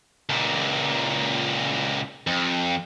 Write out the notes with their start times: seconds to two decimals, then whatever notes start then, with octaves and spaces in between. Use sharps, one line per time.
0.29 C#2 A#2
2.27 F2